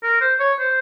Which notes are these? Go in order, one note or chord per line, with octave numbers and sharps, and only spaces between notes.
A#4
C5
C#5
C5